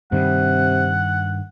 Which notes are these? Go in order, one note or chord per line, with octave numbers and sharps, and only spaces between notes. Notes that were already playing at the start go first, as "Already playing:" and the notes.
G2 C3 D#3 G3 F#5